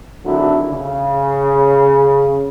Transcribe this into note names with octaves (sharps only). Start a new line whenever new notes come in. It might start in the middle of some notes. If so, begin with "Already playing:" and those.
G#1 D3 F#3 D4 E4
C#3